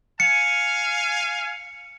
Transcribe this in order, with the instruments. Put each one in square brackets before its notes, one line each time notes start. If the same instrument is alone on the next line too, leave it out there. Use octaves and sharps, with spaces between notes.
[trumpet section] F5 G#5 [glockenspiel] C#7